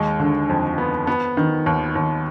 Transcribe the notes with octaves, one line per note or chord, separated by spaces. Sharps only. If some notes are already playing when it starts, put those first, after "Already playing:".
Already playing: D#2 G#3
D3
F2
B3
B3
D#3
D#2
D#2